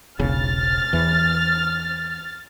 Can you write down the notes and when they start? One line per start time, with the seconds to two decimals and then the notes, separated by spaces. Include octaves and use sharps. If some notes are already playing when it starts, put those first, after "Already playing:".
0.19 E1 B1 C#3 F6 A6
0.93 E2 E3